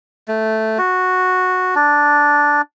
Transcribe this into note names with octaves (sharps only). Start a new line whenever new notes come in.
A3
F#4
D4